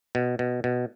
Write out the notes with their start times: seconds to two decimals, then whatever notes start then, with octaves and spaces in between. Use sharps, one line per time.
0.15 B2
0.39 B2
0.64 B2